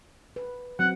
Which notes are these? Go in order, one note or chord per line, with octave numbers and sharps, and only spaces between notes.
B4
F#3 C4 F#5